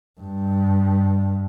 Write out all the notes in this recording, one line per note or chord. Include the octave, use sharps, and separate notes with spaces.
G2